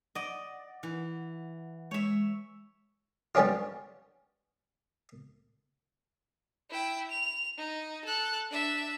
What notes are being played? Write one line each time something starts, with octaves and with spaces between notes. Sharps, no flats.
D5 D#5 F#5
E3
G#3 C#5 E5
G3 B3 C#4 D4 F4
E4 G5
F7
D#4
A4 F#6
D4 E5